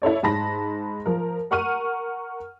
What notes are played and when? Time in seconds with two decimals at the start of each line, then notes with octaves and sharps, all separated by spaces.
0.02 E4 A4 C#5 D5
0.23 G#2 A5 B5 A#6
1.06 F3 A#4
1.51 A#4 F#5 C#6 F6 D#7